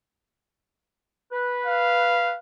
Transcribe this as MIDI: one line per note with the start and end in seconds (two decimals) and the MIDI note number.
1.32 2.34 71
1.66 2.38 77